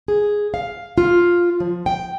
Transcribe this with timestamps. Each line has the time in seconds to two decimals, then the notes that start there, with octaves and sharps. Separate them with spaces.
0.08 G#4
0.54 F5
0.98 F4
1.60 F3
1.86 G5